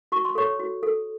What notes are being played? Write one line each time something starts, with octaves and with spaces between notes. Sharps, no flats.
F#4 C#6
C6
A4 C#5 C#6
F#4
A4